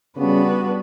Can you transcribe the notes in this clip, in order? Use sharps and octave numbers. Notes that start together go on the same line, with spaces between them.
C#3 G3 B3 D4 F#4 B4